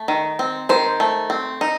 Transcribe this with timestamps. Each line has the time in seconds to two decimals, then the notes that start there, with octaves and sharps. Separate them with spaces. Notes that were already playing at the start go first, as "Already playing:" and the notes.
Already playing: A3
0.08 D#3
0.39 C4
0.69 D#3 C5
1.00 A3
1.30 C4
1.61 D#4